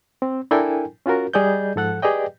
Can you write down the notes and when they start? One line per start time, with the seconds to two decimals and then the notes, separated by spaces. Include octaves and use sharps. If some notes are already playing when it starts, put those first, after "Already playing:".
0.22 C4
0.51 D4 E4 A4 A#4 G5 G#5
1.06 C#4 F4 F#4 A#4
1.34 G3 G#4 D5 D#5 G6
1.76 G#2 F3 A4 F#5 F#6
2.02 G4 G#4 B4 D5 D#5 G5